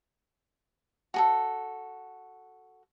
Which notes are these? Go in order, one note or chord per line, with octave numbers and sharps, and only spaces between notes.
F#4 G#4 A4